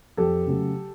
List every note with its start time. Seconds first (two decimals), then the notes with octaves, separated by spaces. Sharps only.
0.17 F2 G4 A4
0.47 C#3 F#3 A3